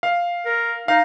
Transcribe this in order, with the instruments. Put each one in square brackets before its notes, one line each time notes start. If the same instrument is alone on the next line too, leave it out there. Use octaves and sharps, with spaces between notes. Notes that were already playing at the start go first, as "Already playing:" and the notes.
[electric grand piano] F5
[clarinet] A#4
[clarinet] D#4 [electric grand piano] F5